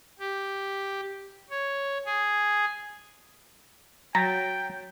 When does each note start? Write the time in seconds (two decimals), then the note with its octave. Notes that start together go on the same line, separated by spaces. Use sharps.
0.19 G4
1.50 C#5
2.05 G#4
4.15 F#3 G5 A#5 A6 B6